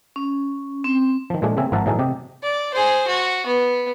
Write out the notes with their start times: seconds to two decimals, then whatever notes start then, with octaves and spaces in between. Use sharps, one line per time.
0.16 C#4
0.84 C4
1.30 D#3 F3
1.42 A#2 F3 G#3 A3 D4
1.57 C#3 A#3 C4 E5 G#5
1.72 G#1 F3 A#4 E5 F#5 A5
1.86 A2 E3 F#3 D#4 G#4 A4
1.99 C3 G4 D#5
2.43 D5
2.74 G#4 C5
3.07 F#4
3.46 B3